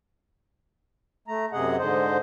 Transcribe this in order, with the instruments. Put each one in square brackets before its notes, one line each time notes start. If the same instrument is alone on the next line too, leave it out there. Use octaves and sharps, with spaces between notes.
[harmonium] A3 A#5
F#2 C3 G#4 D#5 F#5
G#2 D3 C5 D#5